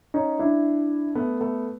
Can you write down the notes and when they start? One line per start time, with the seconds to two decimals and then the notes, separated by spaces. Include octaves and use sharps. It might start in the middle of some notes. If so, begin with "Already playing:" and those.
0.14 C#4 D#4
0.39 D4 E4
1.15 A3 B3
1.41 A3 B3